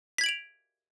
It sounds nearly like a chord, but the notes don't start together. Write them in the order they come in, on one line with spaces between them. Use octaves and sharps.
B6 G#6 F#7 D7 F7